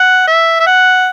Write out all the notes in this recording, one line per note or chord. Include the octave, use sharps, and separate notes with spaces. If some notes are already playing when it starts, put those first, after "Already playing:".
Already playing: F#5
E5
E5
F#5